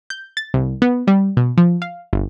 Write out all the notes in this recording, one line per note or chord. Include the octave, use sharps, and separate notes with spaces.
G6
A6
C2
B3
G3
B2
F3
F5
G1